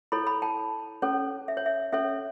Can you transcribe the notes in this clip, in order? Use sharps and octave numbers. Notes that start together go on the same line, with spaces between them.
E4 A4 C#5 B5
B5
A5
C#4 A4 C#5
E5
C#5
E5
C#4 A4 C#5 E5